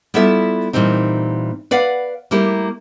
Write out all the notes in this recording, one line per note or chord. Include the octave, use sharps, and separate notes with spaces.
G3 B3 E4 F4 A4 E5
A#2 E3 G3 C4 D#4
B4 D5 F5 F#5
G3 A3 A#3 E4 G4